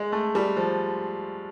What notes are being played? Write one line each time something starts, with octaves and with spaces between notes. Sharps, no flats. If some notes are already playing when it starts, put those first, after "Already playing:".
Already playing: G#3
A3
G3
F3